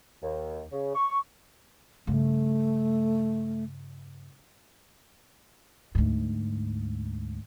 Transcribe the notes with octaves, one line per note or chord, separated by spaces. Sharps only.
D#2
C#3
C#6
G2 C#3 A3
D2 G#2